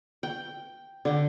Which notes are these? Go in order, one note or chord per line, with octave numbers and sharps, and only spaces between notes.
G5
D3 G5